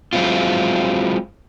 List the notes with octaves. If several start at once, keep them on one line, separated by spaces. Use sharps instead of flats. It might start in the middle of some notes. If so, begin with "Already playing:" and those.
F#3 G#3 C4 E4 F4